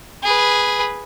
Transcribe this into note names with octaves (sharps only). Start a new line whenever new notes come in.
G#4 B4